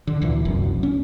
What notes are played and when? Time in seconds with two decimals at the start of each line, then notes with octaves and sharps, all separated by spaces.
0.07 D3
0.22 D2 A#2 E3
0.45 F#1 C2 F#2
0.83 C#4